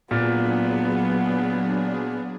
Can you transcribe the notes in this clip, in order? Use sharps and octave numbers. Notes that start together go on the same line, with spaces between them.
A#2 F#3 B3 D4 G#4